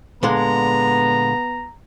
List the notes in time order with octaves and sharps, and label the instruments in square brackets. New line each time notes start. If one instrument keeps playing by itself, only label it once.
[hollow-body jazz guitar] A#2 D3 G#3 [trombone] B3 [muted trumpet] A#5